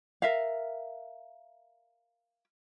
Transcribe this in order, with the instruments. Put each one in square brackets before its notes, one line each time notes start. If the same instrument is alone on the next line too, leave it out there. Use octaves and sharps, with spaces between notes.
[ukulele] A#4 E5 F5